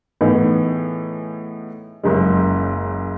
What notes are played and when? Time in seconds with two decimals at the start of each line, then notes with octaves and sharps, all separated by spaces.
0.21 A2 E3 B3 D#4 G#4
2.03 F#1 F#2 C#3 G#3